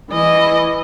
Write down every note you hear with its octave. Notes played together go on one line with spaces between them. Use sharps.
E3 D#5